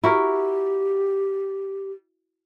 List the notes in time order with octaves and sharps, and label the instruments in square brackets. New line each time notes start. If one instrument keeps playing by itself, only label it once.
[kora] E4 F#4 A#4 [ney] G4